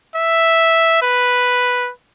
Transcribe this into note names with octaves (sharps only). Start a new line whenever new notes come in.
E5
B4